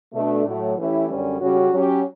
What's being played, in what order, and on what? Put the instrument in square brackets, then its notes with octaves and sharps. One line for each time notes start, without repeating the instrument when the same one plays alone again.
[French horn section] B2 A3 D4
A2 F#3 A3
E3 A3 C#4 E4 G4
F#2 D3 G3 C#4
C#3 G3 C#4 F#4
F#3 C#4 G4